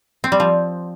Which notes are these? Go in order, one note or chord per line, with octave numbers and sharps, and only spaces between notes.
C4
G3
F3